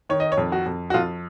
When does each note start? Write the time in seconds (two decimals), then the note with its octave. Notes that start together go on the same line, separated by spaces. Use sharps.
0.09 D#3 C#5
0.20 D#5
0.32 C#5
0.38 F2
0.52 F#4
0.66 F2
0.90 F#4
0.94 F2 F4